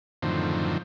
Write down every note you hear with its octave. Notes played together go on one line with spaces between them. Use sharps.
F#2 A2 D3 D#3 F3 C4